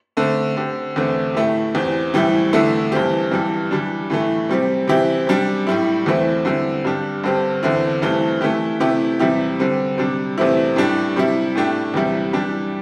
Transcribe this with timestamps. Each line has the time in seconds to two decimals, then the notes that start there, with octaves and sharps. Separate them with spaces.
0.17 D3 A3 C4
0.56 D3 C4 G4
0.96 E2 D3 A3 C4
1.34 A2 A3 E4 G4
1.75 E2 E3 C4 G4
2.14 A2 E3 G3 C4 E4
2.53 E2 D3 A3 E4
2.92 G2 E3 C4 G4
3.31 G2 E3 G3
3.71 E3 G3 D4
4.10 A2 E3 A3
4.49 C3 G3 C4 G4
4.88 C3 E3 C4 E4 G4
5.27 C3 G3 D4
5.67 A2 G3 E4
6.06 E2 E3 A3 C4 E4
6.45 D3 G3 C4 E4
6.84 G2 G3 D4 G4
7.24 G2 D3 C4 G4
7.63 E2 D3 C4 E4
8.02 G2 E3 A3 C4
8.41 E3 A3 E4 G4
8.80 C3 E3 A3 E4 G4
9.19 E2 C3 G3 E4 G4
9.59 D3 G3 C4
9.98 C3 G3 D4
10.38 E2 C3 A3 C4 E4
10.76 A2 G3 D4 G4
11.16 C3 G3 E4
11.55 A2 A3 D4 G4
11.94 E2 C3 G3 E4 G4
12.33 E3 G3 D4 G4